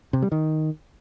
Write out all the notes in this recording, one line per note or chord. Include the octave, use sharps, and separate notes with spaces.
C3
G3
D#3